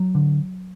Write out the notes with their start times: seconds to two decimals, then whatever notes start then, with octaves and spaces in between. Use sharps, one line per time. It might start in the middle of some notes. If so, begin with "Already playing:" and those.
Already playing: F#3
0.15 D3